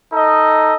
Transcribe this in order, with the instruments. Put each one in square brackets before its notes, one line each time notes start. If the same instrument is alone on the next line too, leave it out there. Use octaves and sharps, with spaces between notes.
[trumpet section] D#4 A4 D#5